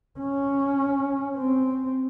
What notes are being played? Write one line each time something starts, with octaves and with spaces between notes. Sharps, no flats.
C#4
C4